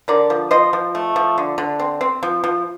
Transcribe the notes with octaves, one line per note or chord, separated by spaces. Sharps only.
D3 A#4 D5
F3
F3 C5 D#5
F3
A3
F3
D3
D3
C4
C4
F3
F3